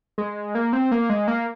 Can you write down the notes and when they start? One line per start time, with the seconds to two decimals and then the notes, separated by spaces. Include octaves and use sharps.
0.18 G#3
0.55 A#3
0.73 C4
0.91 A#3
1.10 G#3
1.28 A#3